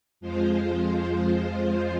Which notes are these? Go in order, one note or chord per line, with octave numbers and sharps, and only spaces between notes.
F2 F3 G#3 F4 C5